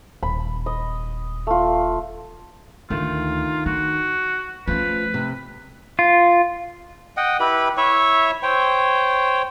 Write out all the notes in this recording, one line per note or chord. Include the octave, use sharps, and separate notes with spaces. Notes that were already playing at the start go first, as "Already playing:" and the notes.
D#1 B5
D#5
A3 F4
D2 D#3 A3 D4 F4
D#4 F#4
F3 A3 C#4 B4
C3
F4
D#5 F#5 G5
E4 G4 B4 B5
E4 C#5 E5 C#6
C5 C#5 G5